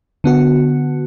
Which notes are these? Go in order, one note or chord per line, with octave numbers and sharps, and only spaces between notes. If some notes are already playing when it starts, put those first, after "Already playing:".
D3 B3 F#4